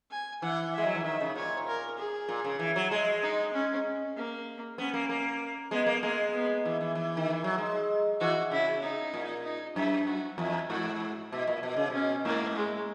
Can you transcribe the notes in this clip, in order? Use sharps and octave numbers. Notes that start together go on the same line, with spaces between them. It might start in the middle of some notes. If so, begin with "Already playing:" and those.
G#5
E3 F#5
G#3 E5
F#3
E3
D#3 E5
C#3
A#2 C#5
A#4
G#4
A#2
C#3
E3
F#3
G#3
D#4
C#4
A#3
B3 C#4
A#3
A#3
G#3 B3
A#3
G#3 A#3
B3
E3
E3
E3
D#3
E3
F#3
G#3
E3 F#4
C#3 E4
D#4
A#2
D#4
F#2 E4
F#4
E2 E4
G#2 F#4
B2 E4
A#2
B2
C#3
B2 C#4
G#2 A#3
G#3